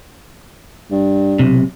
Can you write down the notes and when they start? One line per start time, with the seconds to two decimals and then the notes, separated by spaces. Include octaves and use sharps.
0.91 G2
1.39 B1 C3